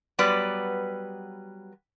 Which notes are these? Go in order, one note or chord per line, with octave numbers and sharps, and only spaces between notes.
F#3 G3 B3 B4 D5